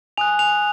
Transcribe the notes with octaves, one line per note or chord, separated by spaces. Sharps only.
G#5 D#6 F#6 F7
F7